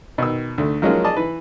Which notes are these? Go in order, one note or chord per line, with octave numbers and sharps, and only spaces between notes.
B2 D#3 E6
D2 A3
F3 F#3 G#3 A#3 C#4 F4
G#4 D5 D#5 A5
E3 B4